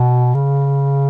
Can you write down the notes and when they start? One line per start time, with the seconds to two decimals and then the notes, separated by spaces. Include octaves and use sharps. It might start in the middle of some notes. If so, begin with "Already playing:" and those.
Already playing: B2
0.34 C#3